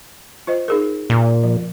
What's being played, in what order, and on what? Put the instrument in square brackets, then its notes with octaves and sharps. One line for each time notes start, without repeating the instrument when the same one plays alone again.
[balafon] F4 C5 D#5
D#4 G#4 A#4
[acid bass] A#2
[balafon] F3